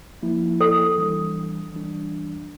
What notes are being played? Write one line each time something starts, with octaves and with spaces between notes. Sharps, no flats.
F3 A#3 E4
A4
E3 G3 D4
E3 G3 D4